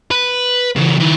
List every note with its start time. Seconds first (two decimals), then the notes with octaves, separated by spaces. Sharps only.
0.11 B4
0.75 C#3 E3
1.00 D#3 E4